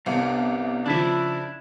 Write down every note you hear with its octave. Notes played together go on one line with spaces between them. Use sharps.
G1 C2 G2 C3
C#3 F3 D4 E4 E5